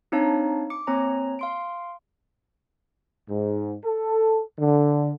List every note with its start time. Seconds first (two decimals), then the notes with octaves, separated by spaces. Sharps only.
0.12 C4 D4 D#4 C#5 F5 A5
0.70 D6 C#7
0.87 A#3 C4 C#5 G#5 A#5
1.39 F5 C6 D7
3.29 G#2
3.84 A4
4.59 D3